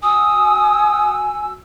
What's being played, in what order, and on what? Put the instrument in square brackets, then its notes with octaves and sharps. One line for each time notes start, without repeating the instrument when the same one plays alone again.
[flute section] F#4 E6 [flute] G#5 [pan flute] D#6